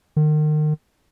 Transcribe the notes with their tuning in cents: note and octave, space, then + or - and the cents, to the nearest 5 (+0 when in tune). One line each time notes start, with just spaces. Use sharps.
D#3 -35